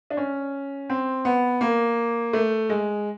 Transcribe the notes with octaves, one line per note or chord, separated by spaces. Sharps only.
D4
C#4
C4
B3
A#3
A3
G#3